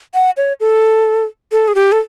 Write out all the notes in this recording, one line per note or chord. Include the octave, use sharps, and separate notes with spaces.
F#5
C#5
A4
A4
G#4
G4
A4